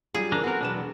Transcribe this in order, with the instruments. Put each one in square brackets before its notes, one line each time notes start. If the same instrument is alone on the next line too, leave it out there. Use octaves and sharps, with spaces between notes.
[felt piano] F#3 G3 F4 [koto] G#4
[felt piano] F#1 A#3 [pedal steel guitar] E3 D4 A#4
[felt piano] B3 C4 A4 [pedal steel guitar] F#4 A#4
[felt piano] E1 B4 E7 [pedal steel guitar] F#3 D4